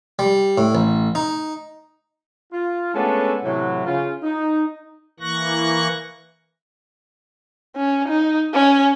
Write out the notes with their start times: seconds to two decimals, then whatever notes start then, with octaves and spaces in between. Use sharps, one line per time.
0.19 G3
0.58 A2
0.75 A1
1.15 D#4
2.53 F4
2.94 G#3 A3 B3 C#4 D4 A4
3.44 A2 C3 E3 F#3
3.85 C#3 F4
4.23 D#4
5.20 E3 A#3 C#6 F#6 A#6
7.76 C#4
8.08 D#4
8.54 C#4